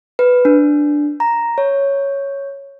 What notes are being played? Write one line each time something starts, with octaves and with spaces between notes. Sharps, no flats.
B4
D4
A#5
C#5